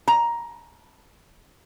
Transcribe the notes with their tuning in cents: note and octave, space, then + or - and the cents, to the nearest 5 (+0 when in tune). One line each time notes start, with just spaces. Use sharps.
A#5 +10